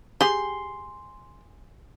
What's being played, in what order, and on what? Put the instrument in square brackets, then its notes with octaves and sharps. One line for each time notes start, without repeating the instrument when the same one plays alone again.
[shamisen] G4 G#4 [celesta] G#5 [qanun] C6